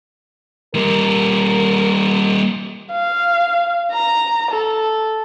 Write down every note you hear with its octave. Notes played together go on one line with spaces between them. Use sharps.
G3 A#3 A#4
F5
A#5
A4